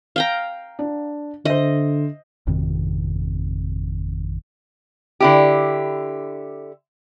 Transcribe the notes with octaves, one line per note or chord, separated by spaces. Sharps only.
F5 G5 A#5
D4
D3 C5 D#5 E5
G#1 F2 C3 D#3
D3 E4 G4